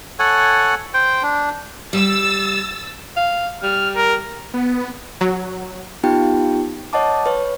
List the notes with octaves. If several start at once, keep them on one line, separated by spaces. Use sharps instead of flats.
A4 C#5 F#5 G#5
C5 G5
D4
G3 E6 A6
F5
G3 F6
A#4
B3
F#3
B3 D#4 F4 G4 G5
C#5 D#5 F#5 A5 D6
B4 C#5